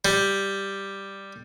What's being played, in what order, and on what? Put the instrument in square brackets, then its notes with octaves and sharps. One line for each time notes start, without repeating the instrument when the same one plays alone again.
[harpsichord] G3